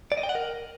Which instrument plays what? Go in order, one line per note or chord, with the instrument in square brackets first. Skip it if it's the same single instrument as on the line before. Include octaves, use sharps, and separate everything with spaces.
[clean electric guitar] D5
D#5
G5
F#5
A#4